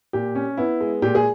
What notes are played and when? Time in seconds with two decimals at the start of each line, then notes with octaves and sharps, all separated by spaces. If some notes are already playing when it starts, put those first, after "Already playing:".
0.13 A#2 G4
0.35 C#4
0.57 B3 E4
0.81 G#3
1.02 A#2 G4
1.15 G#4